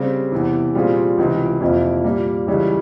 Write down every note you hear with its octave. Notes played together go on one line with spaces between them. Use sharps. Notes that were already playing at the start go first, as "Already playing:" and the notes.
Already playing: C#3 G3 C4
E2 C3 E3
A#2 G3 C4 F4 G#4
C#2 C3 E3
F2 C3 F3 A#3 E4
A#2 G3 A#3
C#2 C#3 E3 G3 C#4